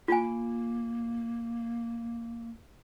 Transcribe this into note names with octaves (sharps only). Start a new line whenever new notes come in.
A#3 F4 G#5